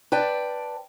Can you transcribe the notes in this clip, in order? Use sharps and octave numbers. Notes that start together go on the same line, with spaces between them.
B4 D5 G5 A5